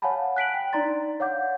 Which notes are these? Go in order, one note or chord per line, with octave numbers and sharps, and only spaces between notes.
C#5 F5 F#5 G#5 A5 B5
F#6 B6 D7 F#7
G5
D4 D#4 D5 A#5 C6 A6
C#5 F5 F#5 D6 G6